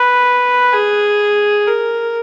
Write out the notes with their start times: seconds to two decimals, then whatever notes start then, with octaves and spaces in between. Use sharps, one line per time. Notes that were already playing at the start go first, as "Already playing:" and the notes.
Already playing: B4
0.73 G#4
1.67 A#4